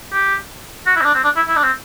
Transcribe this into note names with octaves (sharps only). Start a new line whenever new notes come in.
G4
F#4
E4
C4
D4
C4
D4
E4
E4
D4
C4